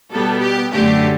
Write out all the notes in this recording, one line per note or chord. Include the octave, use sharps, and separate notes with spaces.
B2 G3 B3 A4
G4
F#2 D3 A3 G4